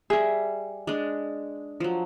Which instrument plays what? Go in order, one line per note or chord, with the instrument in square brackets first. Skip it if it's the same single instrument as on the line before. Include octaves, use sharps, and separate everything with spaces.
[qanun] G3 E5 [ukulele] G#4
[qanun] G#3 D4
F3 F#3